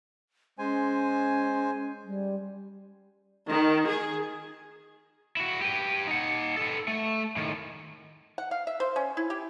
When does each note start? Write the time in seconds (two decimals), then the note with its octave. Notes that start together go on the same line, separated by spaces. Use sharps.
0.58 G#3 C#4 C5 G#5
2.05 G3
3.49 D#3
3.87 G#4
5.37 E4 F#4
5.61 G4 B4
6.07 D#4 F#5
6.57 A4 B4
6.88 A3
7.37 A2 D#3
8.38 F#5
8.51 F5
8.67 E5
8.80 C5
8.96 C#4
9.17 E4
9.30 G4